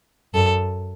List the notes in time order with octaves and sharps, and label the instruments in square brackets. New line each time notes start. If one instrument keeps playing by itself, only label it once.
[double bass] F#2 [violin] A4